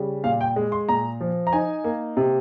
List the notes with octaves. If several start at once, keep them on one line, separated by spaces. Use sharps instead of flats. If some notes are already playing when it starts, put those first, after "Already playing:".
Already playing: C#3 G3
A#2 F5
G5
G#3
C6
A#2 A#5
F3
A#5
D#4 G#5
A#3
C3